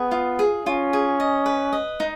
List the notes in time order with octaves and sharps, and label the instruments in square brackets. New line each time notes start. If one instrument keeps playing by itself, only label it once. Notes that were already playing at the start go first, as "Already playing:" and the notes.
Already playing: [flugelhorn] B3 [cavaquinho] G#4
[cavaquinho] F4
G#4
[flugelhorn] C#4 [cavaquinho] F4
[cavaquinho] G#4
D#5
B4
D#5
D#4